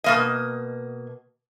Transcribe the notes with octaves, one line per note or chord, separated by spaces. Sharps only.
B2 A#3 D#5